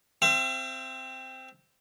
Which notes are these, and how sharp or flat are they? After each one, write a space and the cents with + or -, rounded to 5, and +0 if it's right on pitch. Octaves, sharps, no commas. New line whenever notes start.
C4 +0 E5 +45